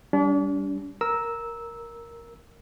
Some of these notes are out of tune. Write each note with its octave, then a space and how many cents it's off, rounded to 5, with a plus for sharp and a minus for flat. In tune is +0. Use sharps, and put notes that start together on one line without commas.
G3 +0 D4 -40
A#4 +0 E6 -10